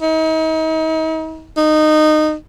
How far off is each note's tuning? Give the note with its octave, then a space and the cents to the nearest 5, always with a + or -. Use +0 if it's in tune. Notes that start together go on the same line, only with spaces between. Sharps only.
D#4 +40
D#4 -20